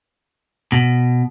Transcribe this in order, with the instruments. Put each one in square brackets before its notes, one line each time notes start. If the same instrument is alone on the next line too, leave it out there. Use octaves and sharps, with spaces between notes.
[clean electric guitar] B2